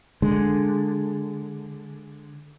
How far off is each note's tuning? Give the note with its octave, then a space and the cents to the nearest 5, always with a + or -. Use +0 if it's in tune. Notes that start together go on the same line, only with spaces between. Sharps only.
D3 +0 G#3 +0